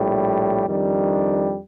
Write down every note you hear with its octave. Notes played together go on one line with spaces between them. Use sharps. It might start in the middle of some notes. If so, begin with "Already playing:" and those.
Already playing: A#1 A2 G3
F2 D#3 G3 D4